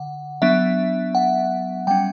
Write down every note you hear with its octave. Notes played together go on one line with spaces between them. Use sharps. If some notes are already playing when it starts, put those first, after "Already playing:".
Already playing: D3 F#5
F#3 B3 D4 E5
F#5
G3 C#4 G5